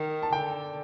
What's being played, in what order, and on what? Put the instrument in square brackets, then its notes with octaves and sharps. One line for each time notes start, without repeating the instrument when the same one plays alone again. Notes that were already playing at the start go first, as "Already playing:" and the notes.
Already playing: [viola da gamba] D#3
[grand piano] A5
[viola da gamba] D3 [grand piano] G5